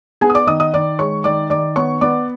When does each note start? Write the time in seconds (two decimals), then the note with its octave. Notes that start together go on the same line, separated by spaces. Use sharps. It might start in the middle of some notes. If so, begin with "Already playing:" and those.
0.21 B3 G#4 G#5
0.30 D#6
0.35 D5 D6
0.47 D#3 D#5 D#6
0.60 D#5 D#6
0.74 D#3 D5 D6
0.99 G#3 C#5 C#6
1.24 D#3 D5 D6
1.50 D#3 D5 D6
1.76 B3 C#5 C#6
2.01 B3 D5 D6